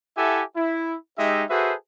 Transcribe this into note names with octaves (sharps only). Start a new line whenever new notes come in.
E4 G4 A4 E5 F#5 G#5
E4
G#3 D#4 G4 D#5 E5
F#4 G#4 A4 B4 C5 E5